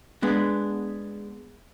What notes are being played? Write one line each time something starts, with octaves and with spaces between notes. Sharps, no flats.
G#3 B3 D4